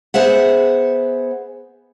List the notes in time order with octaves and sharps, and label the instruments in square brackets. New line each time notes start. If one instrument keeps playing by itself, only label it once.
[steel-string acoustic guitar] B3 G#4 C5 E5 F#5